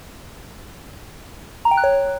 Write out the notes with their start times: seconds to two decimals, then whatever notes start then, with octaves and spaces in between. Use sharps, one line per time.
1.65 A#5
1.71 G5
1.77 F#6
1.84 C#5